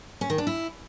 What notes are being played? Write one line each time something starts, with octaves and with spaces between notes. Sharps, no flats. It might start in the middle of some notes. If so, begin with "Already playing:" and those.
C#4
D#3
D4
E4